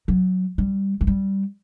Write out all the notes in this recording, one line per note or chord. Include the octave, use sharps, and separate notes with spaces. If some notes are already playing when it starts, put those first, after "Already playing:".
F#3
G3
G#3
G3